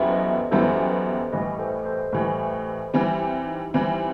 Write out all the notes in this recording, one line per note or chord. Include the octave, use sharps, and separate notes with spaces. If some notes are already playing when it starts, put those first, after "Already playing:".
Already playing: F#2 E3 G3 B3 E4 A4 C5
B4 D#5
F#2 E3 G3 B3 E4 A4 C5
A2 E3 G3 B4 D#5
A4 C5
A4 C5
A2 E3 G3 G4 B4
E3 G3 C4 E4 G4
E4
D#4
E3 G3 C4 E4